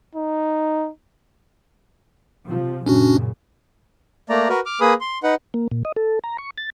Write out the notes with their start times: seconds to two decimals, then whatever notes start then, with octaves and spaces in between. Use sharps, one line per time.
0.15 D#4
2.46 C3 F3
2.86 F#2 A#2 C#3 C#4 D4 F#4
4.30 A3 A#3 D5 A#5
4.49 F#4 A#4 B4
4.66 D6 F6
4.81 A#3 G#4 B4 B5 D#6
5.01 C6
5.23 D#4 B4 F#5
5.54 A#3
5.71 A#2
5.85 D#5
5.97 A4
6.24 A#5
6.38 C#6
6.58 A6